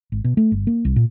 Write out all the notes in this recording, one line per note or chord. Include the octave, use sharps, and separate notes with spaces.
G#1
B2
A3
G1
A#3
C2
A#2